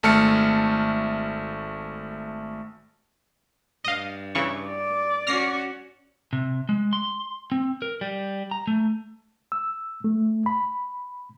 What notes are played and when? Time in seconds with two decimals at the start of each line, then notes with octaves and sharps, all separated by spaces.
0.03 G#1 A3 A5 F6 C#7
3.84 G2 D#5 F5
4.35 C#3 E3 C#6
4.69 D5
5.27 C#4 F#4 F6 A#6 C7
6.33 C3
6.69 G#3
6.93 C6
7.52 C4
7.82 A#4
8.01 G3
8.51 A#5
8.67 A3
9.52 E6
10.04 A3
10.46 B5